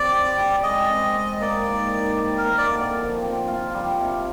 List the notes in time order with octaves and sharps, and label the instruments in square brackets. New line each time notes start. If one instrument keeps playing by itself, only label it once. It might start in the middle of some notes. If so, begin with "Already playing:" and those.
Already playing: [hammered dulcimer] G3 C4 [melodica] D5
[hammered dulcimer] G4
G3
[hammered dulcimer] G#3 [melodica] D#5
[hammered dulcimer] C4
C4
[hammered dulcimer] A#3 [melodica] D5
[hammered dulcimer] G#2
D#4
G3
[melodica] A#4
[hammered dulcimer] A#3
[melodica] D5
[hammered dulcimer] D3
F3
C4
F4
G3
C3